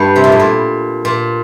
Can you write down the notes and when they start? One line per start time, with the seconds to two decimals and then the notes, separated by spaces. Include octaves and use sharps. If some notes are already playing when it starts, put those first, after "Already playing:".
Already playing: G2
0.16 C3
0.24 A#2
0.32 A2
0.40 A#2
1.05 A#2